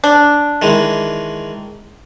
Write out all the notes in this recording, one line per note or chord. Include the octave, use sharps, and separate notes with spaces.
D4
D#3 E3 G#3